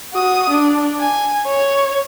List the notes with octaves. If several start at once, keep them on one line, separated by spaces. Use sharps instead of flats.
F#4 D#6
D4
G#5
C#5